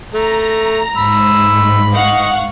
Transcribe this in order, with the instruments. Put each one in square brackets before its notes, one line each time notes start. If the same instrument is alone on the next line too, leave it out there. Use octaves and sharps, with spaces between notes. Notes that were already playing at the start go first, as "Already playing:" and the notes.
[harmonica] A3 [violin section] A#5
[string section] G#2 [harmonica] B5 [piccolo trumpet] E6
[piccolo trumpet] D#5 [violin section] F5 F#5 C#6